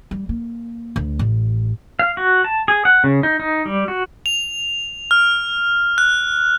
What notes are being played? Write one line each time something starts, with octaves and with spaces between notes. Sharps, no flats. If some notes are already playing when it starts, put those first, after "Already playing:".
G3
A#3
D2
A1
F5
F#4
A5
G#4
F#5
C#3
D#4
D#4
G3
F#4
F7
F6
F#6